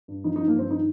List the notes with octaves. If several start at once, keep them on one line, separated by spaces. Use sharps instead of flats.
G2
F3 D#4
D#4
F3
A#3
G2 C4
D#3 D#4